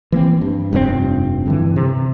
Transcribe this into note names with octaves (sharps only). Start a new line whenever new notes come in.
E3 A#3 C4
G2
F1 G2 C3 C4
G2 D3 E3
C3